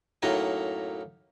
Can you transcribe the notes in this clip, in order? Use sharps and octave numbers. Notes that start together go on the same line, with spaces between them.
F#2 A2 F#3 A#3 D#4 D#5